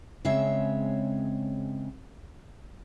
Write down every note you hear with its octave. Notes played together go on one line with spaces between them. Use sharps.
C#3 G#3 C4 C#5 E5